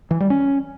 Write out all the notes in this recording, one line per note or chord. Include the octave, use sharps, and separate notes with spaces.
E3
G3
C#4